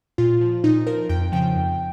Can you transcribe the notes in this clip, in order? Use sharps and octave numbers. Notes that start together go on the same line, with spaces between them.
A#2 F4
F3
A#2 D#4
F3 A#4
F2 G5
C#3 F3 G5
F2